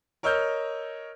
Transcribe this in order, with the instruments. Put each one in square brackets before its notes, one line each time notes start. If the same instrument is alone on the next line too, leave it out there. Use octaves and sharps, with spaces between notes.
[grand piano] A#4 C#5 D#5 E6 F6 G6